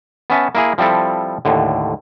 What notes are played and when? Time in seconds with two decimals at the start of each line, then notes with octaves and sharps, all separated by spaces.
0.30 B3 C#4 E5 A5
0.55 A#3 E4 G#4
0.78 F3 G3 C4 E4 A4
1.45 D#2 A2 D3